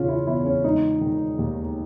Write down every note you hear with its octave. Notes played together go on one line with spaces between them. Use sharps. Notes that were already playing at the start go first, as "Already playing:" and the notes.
Already playing: E2 C#3 C#4 F4
E4
E2 E4
C#4
G#3 D#4
D#3
D#2